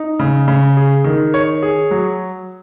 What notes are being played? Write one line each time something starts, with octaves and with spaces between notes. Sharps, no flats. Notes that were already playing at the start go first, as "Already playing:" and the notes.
Already playing: D#4
C#3
C#3
G#4
D#3
C#5
G#4
F#3